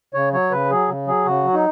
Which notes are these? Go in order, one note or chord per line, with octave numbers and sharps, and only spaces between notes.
C#3 C#5
F#3 C#5
C#3 B4
F#3 G#4
C#3
F#3 G#4
C#3 F#4
F#3
D#4